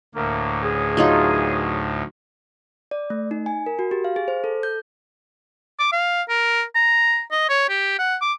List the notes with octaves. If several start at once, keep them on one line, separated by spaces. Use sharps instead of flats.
D2 A2 A#3
C#2 C#3 G#4
F#3 D#4 F4
D5
A3
D#4
G#5
A#4
F#4
G4
F5
G#4
C5
A4
G6
D6
F5
A#4
A#5
D#5
C#5
G4
F#5
D6